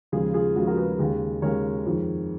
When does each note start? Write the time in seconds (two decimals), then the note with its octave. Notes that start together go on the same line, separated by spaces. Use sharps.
0.12 D#2 C#3 F3 G#3 F4 G#4
0.34 F4 G#4
0.55 D#2 C#3 F3 G#3 F#4
0.67 F#4 A#4
0.77 G#4 B4
0.99 D#2 C#3 G#3
1.42 D#2 C#3 G#3 A#4 C#5
1.86 F2 D#3 G#3